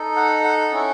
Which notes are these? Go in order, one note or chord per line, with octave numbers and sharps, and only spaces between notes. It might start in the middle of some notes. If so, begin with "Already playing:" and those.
Already playing: D#4 A4
F#5
F#5
C#4 E4 A4